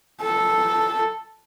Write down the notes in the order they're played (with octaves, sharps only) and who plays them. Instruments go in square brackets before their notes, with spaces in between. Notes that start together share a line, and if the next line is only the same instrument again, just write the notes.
[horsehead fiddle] A4